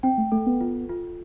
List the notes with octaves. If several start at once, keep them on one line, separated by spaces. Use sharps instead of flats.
C4 G5
A3
A3 A4
B3
F4
F4